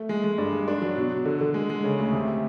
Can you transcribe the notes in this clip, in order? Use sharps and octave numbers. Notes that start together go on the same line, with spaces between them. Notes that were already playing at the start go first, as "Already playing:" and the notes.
Already playing: A3
G#3
G#3
G2
G#3
D4
F#3
B2
B2
D3
D3
G#3
G#3
C#3
D2
C3